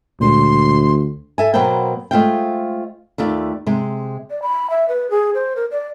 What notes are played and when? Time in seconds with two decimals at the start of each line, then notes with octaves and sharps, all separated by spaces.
0.21 D2 A#2 G#3 C6
1.38 A4 E5 G#5
1.54 B2 F#3 A#3 B3 C5 G5
2.11 G#3 A3 F4 C5 F5 G5
3.18 D#2 A3 F4 D5
3.66 C3 G#3
4.30 D5
4.42 B5
4.70 E5
4.88 B4
5.10 G#4
5.34 C5
5.56 A#4
5.71 D5